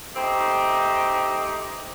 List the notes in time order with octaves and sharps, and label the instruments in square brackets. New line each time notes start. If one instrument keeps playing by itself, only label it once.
[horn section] A3 C4 D#4 G4